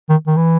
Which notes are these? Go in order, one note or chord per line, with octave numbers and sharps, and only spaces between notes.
D#3
D#3
E3